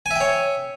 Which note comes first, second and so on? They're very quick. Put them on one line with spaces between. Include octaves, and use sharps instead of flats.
G#5 E5 G5 C#5